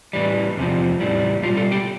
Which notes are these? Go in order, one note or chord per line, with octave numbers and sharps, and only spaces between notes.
A2 E3 G3
E2 C3 F3
A2 E3 G3
B2 G3 F4
A4
G4